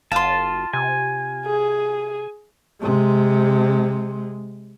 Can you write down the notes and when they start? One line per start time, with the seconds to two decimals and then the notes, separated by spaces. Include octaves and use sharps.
0.12 F#1 F4 A5 C6
0.73 C3 G#5
1.46 G#4
2.81 C3 G#3